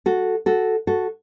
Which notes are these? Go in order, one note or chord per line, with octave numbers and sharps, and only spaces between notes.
F#4 A4
F#4 A4
F#4 A4